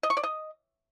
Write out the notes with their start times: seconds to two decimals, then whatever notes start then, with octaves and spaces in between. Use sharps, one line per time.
0.03 D#5
0.10 C#6
0.17 D5
0.23 D#5